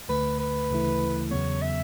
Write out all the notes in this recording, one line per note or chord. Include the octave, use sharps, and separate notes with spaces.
D2 D3 A3 B4
B4
D2 C#3 E3 A3 E4
E2 C#3 F#3 B3 C#5
E5